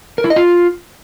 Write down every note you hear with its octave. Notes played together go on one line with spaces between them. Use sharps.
A#4
E4
D#5
F4